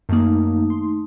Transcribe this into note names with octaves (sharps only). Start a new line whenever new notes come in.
F#2 D#3 A3 A#3 D#4
C6